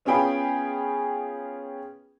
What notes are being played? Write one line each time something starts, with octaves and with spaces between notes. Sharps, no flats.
B3 C#4 F4 G#4 G5 B5